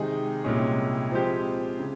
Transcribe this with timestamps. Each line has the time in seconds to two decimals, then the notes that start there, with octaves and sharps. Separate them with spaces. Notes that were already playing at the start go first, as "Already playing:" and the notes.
Already playing: C3 D#3 G#3 D#4 G#4
0.44 C2 A#2 G#3 C#4
1.12 F3 G#3 C4 G4 C5
1.79 C#3